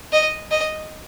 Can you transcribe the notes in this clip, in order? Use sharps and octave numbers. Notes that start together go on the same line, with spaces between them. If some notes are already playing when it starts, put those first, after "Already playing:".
D#5
D#5